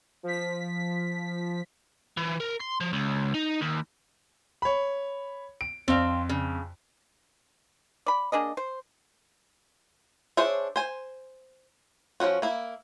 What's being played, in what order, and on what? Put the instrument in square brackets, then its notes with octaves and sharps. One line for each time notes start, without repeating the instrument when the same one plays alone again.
[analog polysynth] F3 B6
[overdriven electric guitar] E3
A#4
C6
F3
C#2
D#4
D#2
[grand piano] C#5 B5
D7
[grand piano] F2 [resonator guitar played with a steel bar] C4 F5
[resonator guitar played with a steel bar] C#3
[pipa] D5 B5
A#3 D4 G#4 D#5
C5
[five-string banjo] D4 G#4 C5 C#5 E5
C5 G#5
F3 F#3 C#4 F#4
A#3 E4